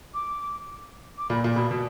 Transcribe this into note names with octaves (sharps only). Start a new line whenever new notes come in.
D6
D6
A#2 B5
A#2
B2 B5
B2